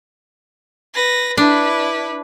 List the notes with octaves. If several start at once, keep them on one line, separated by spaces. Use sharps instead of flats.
B4 A#6
D4 E4 B4